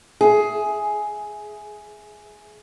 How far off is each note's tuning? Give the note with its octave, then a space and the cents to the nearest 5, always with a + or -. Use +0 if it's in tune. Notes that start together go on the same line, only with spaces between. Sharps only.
G#4 +10 E5 -5